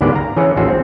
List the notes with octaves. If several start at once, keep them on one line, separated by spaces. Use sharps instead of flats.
D2 G#2 B3 G4 A#4 D5
F5 A#5
E3 C#4 G#4 C#5 F#5
A1 D#2 C#4 F4 F#4 A4
G#3 C4